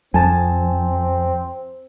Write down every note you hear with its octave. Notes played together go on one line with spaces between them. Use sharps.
F2 C4 G#5 A5